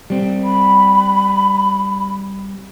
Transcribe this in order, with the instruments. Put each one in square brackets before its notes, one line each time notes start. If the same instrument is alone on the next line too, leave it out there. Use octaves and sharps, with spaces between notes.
[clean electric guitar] G3 C4
[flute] B5